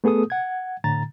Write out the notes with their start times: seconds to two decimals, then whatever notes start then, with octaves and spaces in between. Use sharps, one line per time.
0.04 A3 B3 G#4 A4 D#6
0.30 F#5 G#6
0.84 A2 D3 A#5 A6